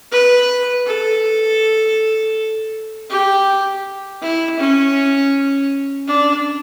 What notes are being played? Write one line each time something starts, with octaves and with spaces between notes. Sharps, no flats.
B4
A4
G4
E4
C#4
D4